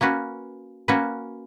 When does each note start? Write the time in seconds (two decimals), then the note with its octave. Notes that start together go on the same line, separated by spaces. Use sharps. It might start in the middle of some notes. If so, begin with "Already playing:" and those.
0.01 A#3 C#4 F#4 B4
0.88 A#3 C#4 F#4 B4